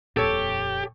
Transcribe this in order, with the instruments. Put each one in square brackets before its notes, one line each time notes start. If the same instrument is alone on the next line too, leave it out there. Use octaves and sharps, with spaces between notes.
[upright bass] D#1 F2 [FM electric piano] A#2 [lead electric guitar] G4 [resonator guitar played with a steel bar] A4 C#5